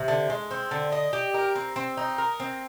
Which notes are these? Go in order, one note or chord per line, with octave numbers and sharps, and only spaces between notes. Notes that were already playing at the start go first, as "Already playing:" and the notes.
Already playing: C3
D3
G#3
C4
D3
D#5
G4
A#4
C4
C4
D#4
A#4
C4